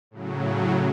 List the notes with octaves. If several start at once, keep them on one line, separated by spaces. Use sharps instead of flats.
A2 C#3 F#3